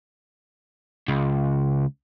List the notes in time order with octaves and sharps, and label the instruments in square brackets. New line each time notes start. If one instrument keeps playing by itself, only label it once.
[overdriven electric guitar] C#2